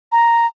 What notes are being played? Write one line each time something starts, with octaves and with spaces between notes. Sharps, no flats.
A#5